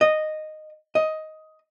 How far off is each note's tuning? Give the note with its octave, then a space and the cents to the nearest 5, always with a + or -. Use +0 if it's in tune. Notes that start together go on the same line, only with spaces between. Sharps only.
D#5 -10
D#5 +10